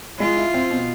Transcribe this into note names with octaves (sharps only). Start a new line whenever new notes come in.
G#3 F4
E4
C4
B2